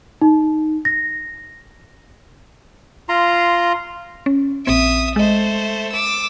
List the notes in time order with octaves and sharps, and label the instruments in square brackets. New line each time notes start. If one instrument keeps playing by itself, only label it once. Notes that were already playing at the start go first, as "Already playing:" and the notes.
[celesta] D#4
A#6
[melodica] F4 A#5 C6
[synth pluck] C#4
[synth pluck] A#1 C4 D7 [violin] E5 D#6
[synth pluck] G#3 D#5 [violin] A3 C5
[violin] D6 E6